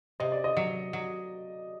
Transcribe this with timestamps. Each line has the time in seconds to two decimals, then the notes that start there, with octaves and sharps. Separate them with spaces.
0.20 C3 D#5
0.32 D5
0.44 D#5
0.57 F#3
0.93 F#3